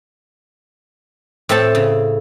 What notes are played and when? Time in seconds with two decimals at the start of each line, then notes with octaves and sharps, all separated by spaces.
1.49 A2 C4 A4 A5
1.75 C#3